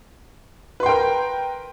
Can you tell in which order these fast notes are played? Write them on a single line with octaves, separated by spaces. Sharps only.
B4 C6 G5 A#4